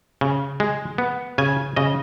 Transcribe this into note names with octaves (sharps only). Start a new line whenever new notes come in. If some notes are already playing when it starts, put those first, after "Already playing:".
C#3
G#3
B3
C#3 G#5
C#3 D#5